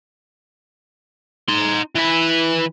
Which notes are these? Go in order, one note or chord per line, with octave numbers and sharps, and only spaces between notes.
D#4 C6
E3 B4